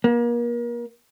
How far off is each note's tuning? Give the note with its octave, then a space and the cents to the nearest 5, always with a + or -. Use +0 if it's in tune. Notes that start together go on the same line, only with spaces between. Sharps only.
A#3 +35